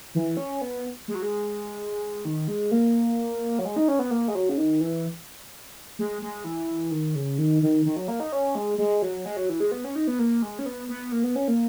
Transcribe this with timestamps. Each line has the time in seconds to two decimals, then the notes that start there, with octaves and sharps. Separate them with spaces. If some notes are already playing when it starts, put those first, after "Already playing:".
0.15 E3
0.37 C#4
0.61 B3
1.08 G#3
1.15 F#3
1.22 G#3
2.25 D#3
2.48 G#3
2.71 A#3
3.59 F#3
3.65 G#3
3.76 D#4
3.88 C#4
3.99 B3
4.11 A#3
4.28 G#3
4.35 F#3
4.49 C#3
4.58 D#3
4.81 E3
5.99 G#3
6.22 G#3
6.44 E3
6.91 D#3
7.15 C#3
7.38 D#3
7.62 D#3
7.85 D#3
7.96 F#3
8.08 A#3
8.20 D#4
8.32 C#4
8.55 G#3
8.78 G#3
9.02 F#3
9.25 G#3
9.37 F#3
9.49 E3
9.60 G#3
9.72 B3
9.84 C#4
9.96 D#4
10.08 B3
10.19 A#3
10.42 G#3
10.59 C#4
10.66 B3
10.89 B3
11.12 A#3
11.24 B3
11.36 C#4
11.48 A#3